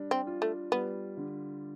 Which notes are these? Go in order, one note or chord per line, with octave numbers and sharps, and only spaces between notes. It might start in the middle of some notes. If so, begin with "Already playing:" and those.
Already playing: G3 D4
C4
F4
A3
G3 B3
D3